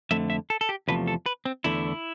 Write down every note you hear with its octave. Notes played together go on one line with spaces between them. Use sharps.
F2 D3 A3 E5
E5
A4
A4
G4
E2 C3 F3 A3 B4
A4
B4
C4
E2 D3 A3 E4